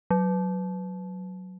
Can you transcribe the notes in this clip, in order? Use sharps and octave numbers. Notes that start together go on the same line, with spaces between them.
F#3